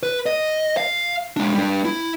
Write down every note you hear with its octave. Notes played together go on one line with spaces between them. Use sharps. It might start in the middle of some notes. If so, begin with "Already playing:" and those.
B4
D#5
F5
G#3 D4
G3 D4
E4